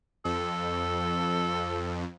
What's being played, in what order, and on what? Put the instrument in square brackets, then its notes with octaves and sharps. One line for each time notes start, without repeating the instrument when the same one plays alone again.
[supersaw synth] F2 [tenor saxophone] A4